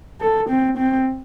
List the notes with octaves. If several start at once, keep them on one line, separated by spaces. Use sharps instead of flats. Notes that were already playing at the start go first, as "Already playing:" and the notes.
A4
C4
C4